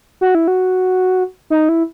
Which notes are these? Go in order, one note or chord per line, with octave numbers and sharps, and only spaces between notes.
F#4
E4
F#4
D#4
E4